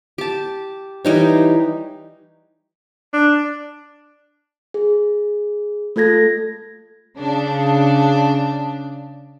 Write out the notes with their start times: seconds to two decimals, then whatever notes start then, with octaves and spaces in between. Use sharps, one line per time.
0.18 G4 A5
1.05 E3 G3 D#4 C#5
3.13 D4
4.74 G#4
5.96 A3 F4 A4 G#6 A#6
7.20 C#3 D4